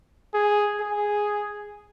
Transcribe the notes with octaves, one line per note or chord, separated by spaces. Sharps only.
G#4
G#4